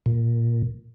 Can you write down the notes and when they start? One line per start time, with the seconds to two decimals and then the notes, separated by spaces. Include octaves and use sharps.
0.06 A#2